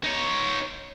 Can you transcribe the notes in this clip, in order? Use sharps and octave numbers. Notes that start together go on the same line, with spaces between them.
D#4 C#5